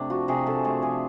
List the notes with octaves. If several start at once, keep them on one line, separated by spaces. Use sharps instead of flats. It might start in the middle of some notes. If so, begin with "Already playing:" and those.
Already playing: C3 A3 D4
F3 F#4
C3 G#4
C3 A4
A3 G#4
F3 G#4